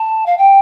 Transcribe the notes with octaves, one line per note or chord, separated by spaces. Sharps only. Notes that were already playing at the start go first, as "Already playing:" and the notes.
Already playing: A5
F5
G5